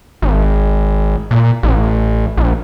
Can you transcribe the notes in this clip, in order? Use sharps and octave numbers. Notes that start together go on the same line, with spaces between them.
G#1
A#2
A1
A#1